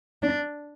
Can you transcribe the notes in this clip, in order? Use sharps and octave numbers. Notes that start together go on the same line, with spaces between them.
D4